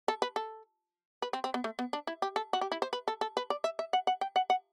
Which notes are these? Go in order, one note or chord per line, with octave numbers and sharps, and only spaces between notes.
A4
B4
A4
B4
C4
C4
B3
A3
B3
D4
E4
G4
A4
F#4
G4
E4
C5
B4
A4
A4
B4
D5
E5
E5
F#5
F#5
G5
F#5
F#5